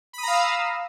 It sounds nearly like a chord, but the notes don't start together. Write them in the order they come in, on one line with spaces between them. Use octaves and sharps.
B5 D#6 A#5 F5 E6